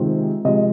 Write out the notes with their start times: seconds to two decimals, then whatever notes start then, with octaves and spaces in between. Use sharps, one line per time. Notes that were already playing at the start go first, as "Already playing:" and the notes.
Already playing: C3 D#3 G#3 C4 F4
0.45 C3 F3 G#3 D#5